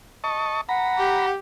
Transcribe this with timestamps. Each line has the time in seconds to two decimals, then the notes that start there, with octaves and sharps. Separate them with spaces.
0.24 D#5 A5 C#6
0.69 F#5 A#5 B5
0.98 G4